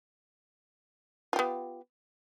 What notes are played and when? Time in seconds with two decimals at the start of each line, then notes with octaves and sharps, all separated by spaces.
1.33 F4
1.36 G4
1.39 B3